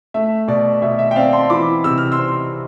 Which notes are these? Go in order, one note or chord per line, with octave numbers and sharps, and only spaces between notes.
A3 E5
B2 D5
B2 E5
E5
G5
C4 D5 F5
A5 C6
E3 B5 D6
C3 E6
F6
C6 E6
C4